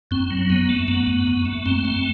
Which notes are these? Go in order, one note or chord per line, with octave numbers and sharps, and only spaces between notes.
F#2 C4
F#3
F#2 B3
A3
F#2 B3
F#2
F#2
A3
F#2 C4
A3